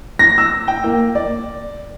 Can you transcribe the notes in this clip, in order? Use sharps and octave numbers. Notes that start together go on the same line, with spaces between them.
A#6
E6
G5
A#3
D5